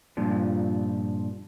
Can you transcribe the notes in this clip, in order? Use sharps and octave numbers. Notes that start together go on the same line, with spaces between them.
G2 A#2 F3